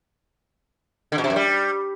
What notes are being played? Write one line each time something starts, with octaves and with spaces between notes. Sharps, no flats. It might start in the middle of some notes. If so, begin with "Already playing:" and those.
D3
B2
C3
F#2
G3